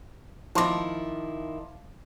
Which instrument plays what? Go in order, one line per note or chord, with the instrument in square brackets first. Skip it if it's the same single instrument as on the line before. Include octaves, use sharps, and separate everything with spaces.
[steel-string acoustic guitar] D#3 E4 [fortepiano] F3 [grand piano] A5 C6 D6